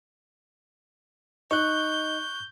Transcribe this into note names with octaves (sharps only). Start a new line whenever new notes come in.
D#4 C#6 F#6 G6